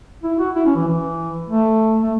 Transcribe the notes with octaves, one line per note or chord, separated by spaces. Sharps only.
E4
F#4
E4
C#4
E3
E3
A3
A3